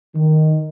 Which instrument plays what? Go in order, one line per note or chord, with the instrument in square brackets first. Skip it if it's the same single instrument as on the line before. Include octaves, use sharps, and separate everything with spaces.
[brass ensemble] D#3